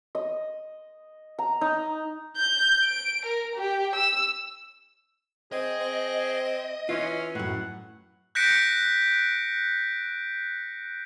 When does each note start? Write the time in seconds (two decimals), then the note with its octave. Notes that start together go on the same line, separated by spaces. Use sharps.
0.15 D#5
1.39 A#5
1.61 D#4
2.36 G6
2.84 D7
3.25 A#4
3.55 G4
3.95 E6
5.52 C4 G#4 D#5
5.81 C4
6.89 E3 C#4 F4
7.35 F#2 A2 F#5
8.35 F#6 G6 A#6 B6 C#7 D7